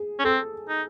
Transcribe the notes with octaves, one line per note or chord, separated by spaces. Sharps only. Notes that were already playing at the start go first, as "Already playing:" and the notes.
Already playing: G#4
C#4
C4 A4
D#4